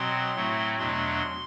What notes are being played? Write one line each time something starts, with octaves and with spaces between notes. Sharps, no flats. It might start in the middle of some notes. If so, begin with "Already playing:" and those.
Already playing: B2 F#3 C4 C6
A2 F#3 A3 C4
E2 B2 F#3 A3 D4 C6